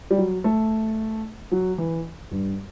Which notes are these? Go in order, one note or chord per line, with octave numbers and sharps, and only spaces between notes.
G3
F#3
A3
F#3
E3
G2